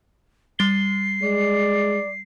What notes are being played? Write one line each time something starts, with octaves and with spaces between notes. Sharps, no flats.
G3 A6 C7 G7
G#3 D5